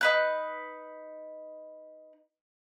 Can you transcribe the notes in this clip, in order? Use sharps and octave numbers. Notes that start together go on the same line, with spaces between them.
D#4 B4 F#6